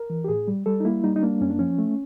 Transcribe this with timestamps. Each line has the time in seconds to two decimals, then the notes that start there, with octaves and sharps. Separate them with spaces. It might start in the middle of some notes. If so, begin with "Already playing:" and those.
Already playing: A#4
0.10 E3
0.24 G4
0.28 A2 G#4
0.48 G3
0.66 G3 A4
0.80 D#4
0.85 A#3 E4
1.04 G3 D#4
1.16 D#4
1.23 A#3 D4
1.41 F#2 C#4
1.50 D4
1.59 F3 C#4
1.78 A3